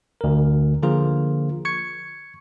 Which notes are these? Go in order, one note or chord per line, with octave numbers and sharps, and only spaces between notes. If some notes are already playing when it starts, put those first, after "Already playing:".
D2 A#4
D3 F3 A#3 F4 G#4 A#4
C#6 G#6 C#7